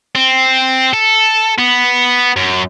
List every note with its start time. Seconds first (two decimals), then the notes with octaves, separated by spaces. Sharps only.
0.15 C4
0.93 A4
1.58 B3
2.37 F#2